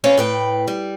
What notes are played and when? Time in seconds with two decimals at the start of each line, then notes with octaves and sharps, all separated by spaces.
0.04 C3 B3 C#4 C#5 D5 F5
0.17 A2 B4 G5
0.68 G3